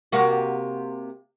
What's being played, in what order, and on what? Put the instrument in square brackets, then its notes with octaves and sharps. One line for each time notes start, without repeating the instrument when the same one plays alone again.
[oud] C3 A#3 F#4